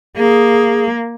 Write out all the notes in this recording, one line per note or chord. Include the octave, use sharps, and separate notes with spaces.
A#3 G#4